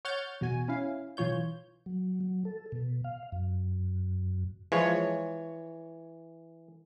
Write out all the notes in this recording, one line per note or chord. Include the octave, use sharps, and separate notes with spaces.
C#5 F#5 F6 G6 A6
E2 B2 F#4 G#5
C#4 E4 F5
B1 E3 F4 C#5 G6
F#3
F#3
A4
B2
F5
F#2
E3 F3 G#3 C#5